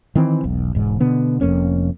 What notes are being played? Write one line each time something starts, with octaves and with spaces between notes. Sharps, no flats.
D#3 E3 C4
E1 B1
E1 G#2
B2 D3 B3
F1 F2 A#3 C#4